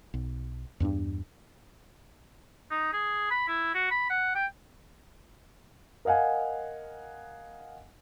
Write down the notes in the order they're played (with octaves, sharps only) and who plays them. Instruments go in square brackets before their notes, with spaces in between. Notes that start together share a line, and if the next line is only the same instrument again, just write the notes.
[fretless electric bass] B1
E2 G2 G#3 D4
[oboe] D#4
G#4
B5
E4
F#4
B5
F#5
G5
[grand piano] A#4 D#5 F5 F#5 G#5